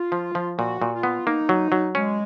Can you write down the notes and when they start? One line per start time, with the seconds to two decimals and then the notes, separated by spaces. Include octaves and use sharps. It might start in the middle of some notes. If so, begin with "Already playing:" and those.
Already playing: F4
0.12 F3
0.35 F3
0.58 A#2 F#4
0.82 A#2
0.93 F4
1.03 B3
1.26 A#3 D#4
1.49 F#3
1.72 F#3
1.95 G#3 C#4